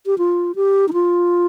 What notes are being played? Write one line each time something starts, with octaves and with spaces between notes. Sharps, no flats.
G4
F4
G4
D#4
F4